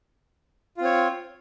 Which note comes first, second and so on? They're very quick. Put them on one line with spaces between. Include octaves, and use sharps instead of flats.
F4 C4 C#5